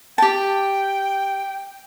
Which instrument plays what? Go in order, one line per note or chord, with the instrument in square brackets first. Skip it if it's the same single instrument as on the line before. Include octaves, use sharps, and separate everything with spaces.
[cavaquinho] G4 A5 [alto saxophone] G5